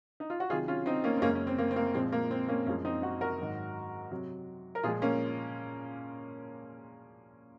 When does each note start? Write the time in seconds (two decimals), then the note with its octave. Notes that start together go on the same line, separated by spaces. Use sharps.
0.20 D#4
0.30 F4
0.40 F#4
0.50 C3 D#3 F#3 F4 G#4
0.68 C#4 F4
0.86 C4 D#4
1.04 A#3 C#4
1.17 C4
1.22 F#2 C#3 G#3 A#3 C#4
1.35 C#4
1.47 C4
1.58 A#3
1.71 C4
1.76 A#3
1.94 A#2 F3 G#3 C4
2.12 A#3
2.31 C4
2.48 A#3 C#4
2.66 F#2 F3 G#3 A#3 C#4
2.85 C4 D#4
3.02 D#4 F#4
3.21 F#4 A#4
3.39 G#2 D#3 F#3
4.11 C3 F#3
4.75 A#4
4.83 A#2 F3 G#3 F4 G#4
5.02 A#3 C#4